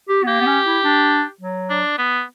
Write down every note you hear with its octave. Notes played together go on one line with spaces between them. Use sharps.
G4
B3
A#3 G4
B3
C#4
E4
D4
F#3
D4
B3